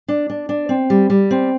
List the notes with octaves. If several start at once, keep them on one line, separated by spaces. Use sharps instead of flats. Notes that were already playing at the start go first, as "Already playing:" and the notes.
D4
D4
D4
C4
G3
G3
C4